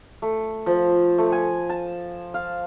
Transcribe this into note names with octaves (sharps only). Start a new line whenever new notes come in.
A3
F3
A3
G#5
A5
F5